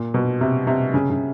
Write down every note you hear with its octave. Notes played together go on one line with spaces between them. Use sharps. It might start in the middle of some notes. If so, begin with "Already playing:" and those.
Already playing: A#2
B2
C3
C3
C#3
C#3